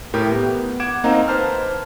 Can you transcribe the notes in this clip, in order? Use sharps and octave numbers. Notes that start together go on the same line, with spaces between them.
A2 G4 A#4 G6
B3
F#5 D6 G#6 D7 E7
A#3 C4 D#4 D#5 F5 A#5
B4 C5 A5 F6